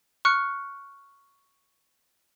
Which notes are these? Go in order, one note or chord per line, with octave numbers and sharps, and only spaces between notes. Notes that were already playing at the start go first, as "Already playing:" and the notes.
C#6 F6 F#6 C#7